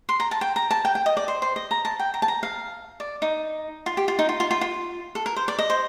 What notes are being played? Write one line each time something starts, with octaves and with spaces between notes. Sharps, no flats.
C6
A#5
A5
G5
A#5
A5
G5
G5
D#5
D5
C5
C5
D#5
A#5
A5
G5
A#5
A5
A#5
F5
D5
D#4
F4
G4
F4
D#4
F4
F4
F4
F4
A4
A#4
C5
D5
D#5
C5